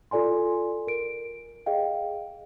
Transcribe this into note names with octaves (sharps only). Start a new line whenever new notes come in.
F4 A4 D5 G#5 C6
A#4 D7
G#4 D#5 F5 G5